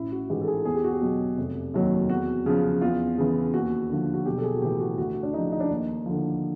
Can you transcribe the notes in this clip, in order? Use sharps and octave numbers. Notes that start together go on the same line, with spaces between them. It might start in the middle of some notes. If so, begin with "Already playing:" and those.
Already playing: A1 E4
F#4
G#2 E3 G4
A4
G#4
E2 G#4
G4
F#4
G4
B2 F#3
F1
D#2 D#3 F#3
E2 F#4
C#3 F3
E2 F4
C#3 E3
D#2 F#4
D3 F3
F#4
B1 G4
A4
G#4
F#4
A2 E3 G4
F#4
D2 F#4
D4
C#3 F3 D#4
D#4
D4
D#2 D#4
D3 F3